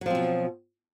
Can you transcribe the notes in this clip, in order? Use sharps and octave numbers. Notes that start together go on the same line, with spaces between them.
B2 F3 F#3 C4